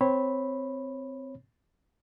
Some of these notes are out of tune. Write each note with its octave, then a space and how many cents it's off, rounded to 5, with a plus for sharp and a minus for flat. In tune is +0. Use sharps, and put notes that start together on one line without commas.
C4 -10 C#5 -20 B5 +0